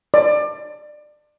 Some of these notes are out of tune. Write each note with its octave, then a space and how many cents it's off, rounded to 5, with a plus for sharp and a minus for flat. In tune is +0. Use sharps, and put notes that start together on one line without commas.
D5 +25